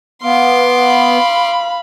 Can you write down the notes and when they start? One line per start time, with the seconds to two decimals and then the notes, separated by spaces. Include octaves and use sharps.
0.23 B3 F5 C6 D6
0.80 F5 B5